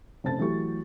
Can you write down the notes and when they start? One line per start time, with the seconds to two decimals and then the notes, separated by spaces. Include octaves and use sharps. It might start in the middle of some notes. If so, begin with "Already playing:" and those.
0.24 F1 C#3 C5 A5 A6
0.39 E3 F#3 A3 G4 C#6